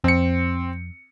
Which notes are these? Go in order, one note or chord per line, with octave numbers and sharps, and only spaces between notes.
F2 C4 C#7